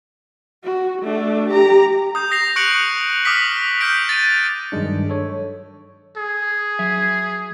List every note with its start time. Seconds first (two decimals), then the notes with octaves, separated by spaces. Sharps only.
0.64 F#4
1.02 A3 D4
1.50 G4 A#5
2.15 D#6 G6
2.31 D#6 A#6 C7 F7
2.56 C#6 F#6 C#7 D7 F#7
3.25 D6 D#6 F6 B6 F#7
3.81 F6 G6 B6 D7
4.09 A6 D#7
4.72 G2 D#3 F#3 G#3 D4
5.10 A4 C#5
6.17 G#4
6.79 F#3 E5